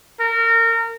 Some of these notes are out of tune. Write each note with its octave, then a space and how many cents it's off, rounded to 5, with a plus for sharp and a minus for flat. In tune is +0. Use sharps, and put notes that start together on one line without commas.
A#4 -30